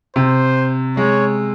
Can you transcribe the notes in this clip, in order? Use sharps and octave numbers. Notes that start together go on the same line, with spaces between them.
C3 C5
G#3 C#5